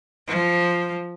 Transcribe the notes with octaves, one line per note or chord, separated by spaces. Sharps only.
F3